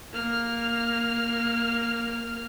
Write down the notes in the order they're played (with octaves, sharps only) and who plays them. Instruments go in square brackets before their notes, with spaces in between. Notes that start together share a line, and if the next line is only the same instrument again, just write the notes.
[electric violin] A#3 F6